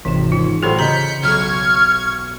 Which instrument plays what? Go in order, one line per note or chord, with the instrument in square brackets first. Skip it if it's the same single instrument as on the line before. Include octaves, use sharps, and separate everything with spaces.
[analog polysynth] G#1 [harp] C3 E7 [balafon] E3
[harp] C#4 [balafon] F4
[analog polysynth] A2 F#3 G3 [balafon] A4 C5 [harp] C6 C#6 E6
[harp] C#3 [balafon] D#5 A#5 [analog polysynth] G6 B6 C#7
[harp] B1 [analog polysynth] C#6 G#6 [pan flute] F6